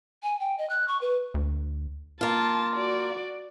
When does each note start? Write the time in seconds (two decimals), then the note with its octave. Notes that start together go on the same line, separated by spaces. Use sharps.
0.23 G#5
0.40 G5
0.58 D#5
0.69 F#6
0.88 C#6
1.01 B4
1.34 D2
2.21 A#3 F4 A5
2.76 F#4 D5